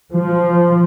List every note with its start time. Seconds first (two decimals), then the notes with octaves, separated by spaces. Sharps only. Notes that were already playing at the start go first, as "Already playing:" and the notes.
0.13 F3